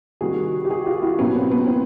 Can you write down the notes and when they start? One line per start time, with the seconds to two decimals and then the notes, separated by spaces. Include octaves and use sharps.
0.21 C3 D#3 G3 F#4 G#4
0.65 G4
0.70 F#4 G#4
0.86 F4 G4
1.02 E4 F#4
1.19 B2 F#3 A#3 B3 C#4
1.35 C4
1.51 B3 C#4
1.67 C4